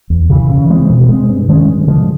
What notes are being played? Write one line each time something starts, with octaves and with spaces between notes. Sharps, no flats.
E2
C#3 E3
C#3
E3 G#3 C4
B2
G#3 C4
G2
D#3 G#3 C#4
G2
D3 F3 G#3